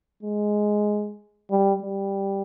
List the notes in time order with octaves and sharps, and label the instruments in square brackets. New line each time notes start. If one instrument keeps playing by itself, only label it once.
[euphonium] G#3
G3
G3